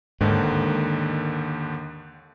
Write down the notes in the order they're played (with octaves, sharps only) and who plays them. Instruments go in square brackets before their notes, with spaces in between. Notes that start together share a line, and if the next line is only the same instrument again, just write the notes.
[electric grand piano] D#2 D3 D#3 [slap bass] G#2